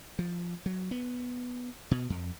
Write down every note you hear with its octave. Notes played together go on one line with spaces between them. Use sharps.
F3
F#3
B3
B2
F2